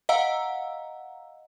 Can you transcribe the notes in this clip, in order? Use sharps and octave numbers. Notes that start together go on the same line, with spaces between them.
D#5 F5 F#5 A#5 E6